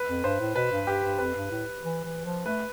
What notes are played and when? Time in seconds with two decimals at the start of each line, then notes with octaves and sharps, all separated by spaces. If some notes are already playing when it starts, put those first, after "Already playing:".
Already playing: B4
0.08 F2
0.24 G2 C5
0.40 A2
0.55 B2 B4
0.71 G2
0.87 G2 G4
1.03 G2
1.18 F2 B4
1.35 G2
1.50 A2
1.82 E3
2.04 E3
2.24 F3
2.46 A3 B4